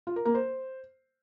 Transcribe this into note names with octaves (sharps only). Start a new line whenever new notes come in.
F4
A#4
A#3
C5